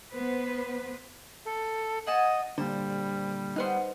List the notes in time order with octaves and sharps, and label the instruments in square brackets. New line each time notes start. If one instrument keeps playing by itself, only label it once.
[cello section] B3 B4 C5
[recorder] A4
[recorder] D#5 [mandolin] F#5 G#5 A5
[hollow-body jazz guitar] A#2 D3 [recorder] G3 [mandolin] C5
[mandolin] B3 F6 F#6 [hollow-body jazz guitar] D#4 B4 C5